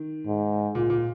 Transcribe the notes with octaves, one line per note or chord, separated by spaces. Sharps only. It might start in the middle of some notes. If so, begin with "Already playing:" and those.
Already playing: D#3
G#2
A#2
A#2